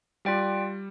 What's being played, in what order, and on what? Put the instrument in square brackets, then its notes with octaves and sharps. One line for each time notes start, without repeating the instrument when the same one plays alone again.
[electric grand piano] G3 [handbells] F4 D5 G5